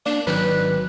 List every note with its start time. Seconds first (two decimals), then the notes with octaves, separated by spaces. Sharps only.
0.06 A#3 D4 D5
0.27 G#1 D#3 F#3 B4 F#6